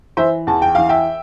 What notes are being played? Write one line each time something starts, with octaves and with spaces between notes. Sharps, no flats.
E3 C5 E5
E2 A5
G5
E3 F5
E5 G5